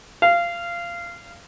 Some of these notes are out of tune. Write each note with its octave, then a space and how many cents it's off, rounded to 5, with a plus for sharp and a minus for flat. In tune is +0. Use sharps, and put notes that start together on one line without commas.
F5 -20